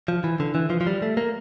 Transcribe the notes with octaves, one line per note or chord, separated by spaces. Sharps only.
F3
E3
D3
E3
F3
F3
G3
A3
A#3